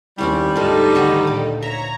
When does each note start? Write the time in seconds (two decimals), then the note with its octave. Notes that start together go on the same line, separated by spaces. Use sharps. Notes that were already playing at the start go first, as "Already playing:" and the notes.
0.18 D#2 G3 C4 C#4 E4
0.56 D2 G#2 D4 D#4 F4 A4
0.95 D3 D#3 C#6
1.27 A#2 D6
1.62 C#5 E5 A#5